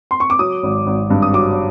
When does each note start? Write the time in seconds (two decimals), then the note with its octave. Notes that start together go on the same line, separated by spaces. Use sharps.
0.11 C6
0.20 C#6
0.30 D6
0.39 F#3 D#6
0.63 G#1
0.87 G#1
1.10 G2
1.22 D#6
1.34 F#3 D6